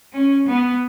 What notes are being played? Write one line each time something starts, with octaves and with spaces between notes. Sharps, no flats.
C#4
B3